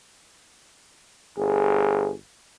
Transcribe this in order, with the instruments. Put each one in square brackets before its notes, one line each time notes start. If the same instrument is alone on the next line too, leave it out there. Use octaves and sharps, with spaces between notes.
[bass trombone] G1 [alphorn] G#4